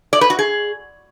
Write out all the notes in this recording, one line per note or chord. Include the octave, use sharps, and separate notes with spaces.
D5
B4
F#4
G#4